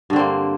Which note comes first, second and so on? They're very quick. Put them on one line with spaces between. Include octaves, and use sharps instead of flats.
G2 D3 C4 A#3